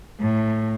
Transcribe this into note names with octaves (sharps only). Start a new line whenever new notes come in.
A2